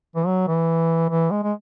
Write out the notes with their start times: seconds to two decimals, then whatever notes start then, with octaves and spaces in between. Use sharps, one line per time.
0.16 E3
0.26 F#3
0.48 E3
1.10 E3
1.31 G#3
1.43 G#3